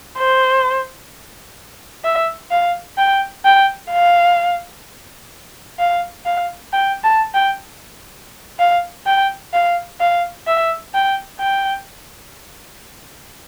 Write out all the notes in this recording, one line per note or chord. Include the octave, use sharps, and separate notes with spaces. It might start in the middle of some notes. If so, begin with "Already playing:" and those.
C5
E5
F5
G5
G5
F5
F5
F5
G5
A5
G5
F5
G5
F5
F5
E5
G5
G5